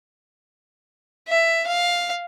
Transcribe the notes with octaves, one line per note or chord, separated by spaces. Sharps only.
E5
F5